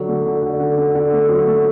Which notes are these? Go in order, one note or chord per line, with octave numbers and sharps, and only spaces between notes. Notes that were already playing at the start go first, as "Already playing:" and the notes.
Already playing: D3 F#3
A3
D3
D3
D3
D3
D3
A3
F#3
A3